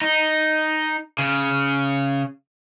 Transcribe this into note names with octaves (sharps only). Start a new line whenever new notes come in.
D#4
C#3